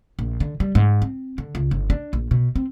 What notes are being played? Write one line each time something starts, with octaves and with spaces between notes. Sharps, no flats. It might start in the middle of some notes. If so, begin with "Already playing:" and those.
A#1
D3
G3
G#2
C4
D3
C#2
G1
D4
A#1
B2
C4